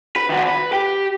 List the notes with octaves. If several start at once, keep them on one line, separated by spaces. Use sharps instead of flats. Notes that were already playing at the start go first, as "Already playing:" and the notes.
B4
D#3 F#4
B4
G4